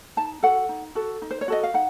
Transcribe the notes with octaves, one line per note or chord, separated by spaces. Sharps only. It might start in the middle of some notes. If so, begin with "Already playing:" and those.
D#4 A5
F#4 A4 F#5
D#4
F#4 A4
D#4
C5
C#5
F#4 A4 D#5
F5
D#4 F#5